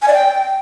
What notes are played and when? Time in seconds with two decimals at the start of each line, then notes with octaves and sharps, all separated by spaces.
0.02 G#5
0.08 D5
0.14 G5